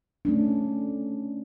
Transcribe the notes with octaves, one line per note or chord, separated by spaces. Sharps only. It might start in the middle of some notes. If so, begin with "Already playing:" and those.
A3 C#4 D4